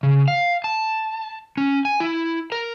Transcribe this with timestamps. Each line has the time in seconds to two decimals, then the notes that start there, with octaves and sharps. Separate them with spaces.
0.03 C#3
0.28 F5
0.64 A5
1.57 C#4
1.85 G#5
2.00 E4
2.52 A#4